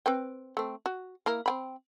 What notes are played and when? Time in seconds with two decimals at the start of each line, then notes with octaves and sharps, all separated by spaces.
0.06 C4 B4 G5
0.57 A3 C4
0.86 F#4
1.26 A#3 E4 A#4
1.46 C4 G5 B5